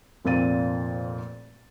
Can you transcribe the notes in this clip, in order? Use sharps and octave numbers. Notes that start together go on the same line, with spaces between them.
F1 F2 A#2 C4 A6 D#7